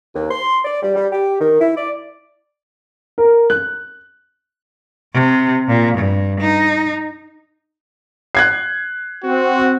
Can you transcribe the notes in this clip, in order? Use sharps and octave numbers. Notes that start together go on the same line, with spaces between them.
D#2
C6
D5
G3
G3
G4
D#3
E4
D5
A#4
F#6
C3
A#2
G2
D#4
F#6 G#6 C7
C4 F#4